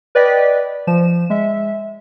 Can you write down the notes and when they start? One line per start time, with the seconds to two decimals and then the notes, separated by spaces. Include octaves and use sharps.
0.15 B4 D5 D#5 G5 B6
0.87 F3 E7
1.30 G#3 E5